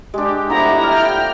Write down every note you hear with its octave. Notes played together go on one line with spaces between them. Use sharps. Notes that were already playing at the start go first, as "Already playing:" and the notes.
G#3 D4 G4
F3 A3 B3 E4 A#5
D5 G5 A5 F6